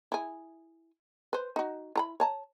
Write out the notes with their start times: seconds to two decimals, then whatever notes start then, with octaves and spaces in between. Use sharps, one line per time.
0.12 E4 G#4
1.33 B4 C5
1.56 D#4 F#4
1.96 E4 A#5 B5
2.20 C#5 A5 A#5